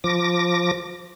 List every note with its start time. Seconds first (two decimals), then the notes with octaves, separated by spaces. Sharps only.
0.04 F3 D6 A#6